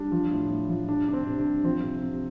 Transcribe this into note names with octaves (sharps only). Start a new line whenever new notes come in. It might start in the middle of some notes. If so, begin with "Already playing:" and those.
Already playing: G3 D4
F3
A2
A2
F3
G3 D4
C3 D4
C4
C3
D4
G3
F3 C4
C3
C3